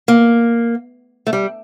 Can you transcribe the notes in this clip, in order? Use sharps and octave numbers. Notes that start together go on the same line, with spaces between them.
A#3
A3
G3